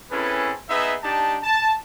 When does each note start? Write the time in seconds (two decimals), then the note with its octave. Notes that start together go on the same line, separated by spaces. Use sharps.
0.11 C4 C#4 E4 G#4 A4 B4
0.69 B3 D#4 G#4 E5
1.03 D4 D#4 G4 A5
1.43 A5